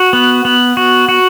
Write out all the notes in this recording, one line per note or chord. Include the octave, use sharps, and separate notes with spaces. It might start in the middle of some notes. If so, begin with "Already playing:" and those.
Already playing: F#4
B3
B3
F#4
F#4